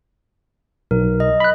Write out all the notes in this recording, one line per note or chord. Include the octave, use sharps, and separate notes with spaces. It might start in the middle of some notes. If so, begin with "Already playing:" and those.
B1 A#4
D#5
B5 F#6